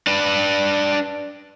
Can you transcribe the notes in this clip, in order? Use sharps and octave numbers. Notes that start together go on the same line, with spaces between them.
D4 B4